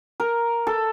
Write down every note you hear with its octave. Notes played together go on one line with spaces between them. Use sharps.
A#4
A4